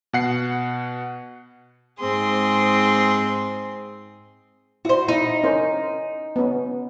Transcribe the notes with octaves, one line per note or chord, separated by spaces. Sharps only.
B2 F#5 C7
G#2 C4 G#4 C6
E4 F#4 C5
D#4 E4
C#4 A#4 C5
B3 C#4